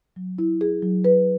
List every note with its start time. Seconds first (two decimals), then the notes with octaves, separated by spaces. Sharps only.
0.16 F#3
0.38 E4
0.61 G#4
0.82 F#3
1.04 B4